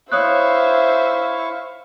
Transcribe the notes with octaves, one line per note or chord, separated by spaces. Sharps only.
E4 C5 C#5 E5 F5 C#6 D#6 F#6